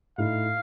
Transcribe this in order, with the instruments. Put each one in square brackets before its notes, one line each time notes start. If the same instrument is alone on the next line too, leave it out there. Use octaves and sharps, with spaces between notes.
[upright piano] A2 A3 D#4 [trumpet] F5